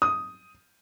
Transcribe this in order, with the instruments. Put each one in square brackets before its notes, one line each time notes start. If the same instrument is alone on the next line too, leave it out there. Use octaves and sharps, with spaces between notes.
[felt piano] D#6